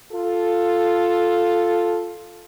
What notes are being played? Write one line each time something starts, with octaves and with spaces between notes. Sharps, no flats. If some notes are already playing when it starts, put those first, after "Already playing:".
F4 A4